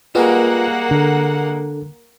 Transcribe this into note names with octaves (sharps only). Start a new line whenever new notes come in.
G3 G#3 A#3 F4 F#4 B4 F#5
D3 D4 A4